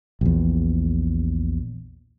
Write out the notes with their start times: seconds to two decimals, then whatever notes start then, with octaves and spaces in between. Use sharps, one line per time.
0.21 A#1 E2